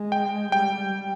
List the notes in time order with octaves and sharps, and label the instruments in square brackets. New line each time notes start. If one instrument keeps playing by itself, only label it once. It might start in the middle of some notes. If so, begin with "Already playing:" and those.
Already playing: [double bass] G#3
[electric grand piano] G5
[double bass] G3 [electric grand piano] G5